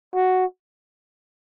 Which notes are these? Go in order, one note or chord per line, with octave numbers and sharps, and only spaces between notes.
F#4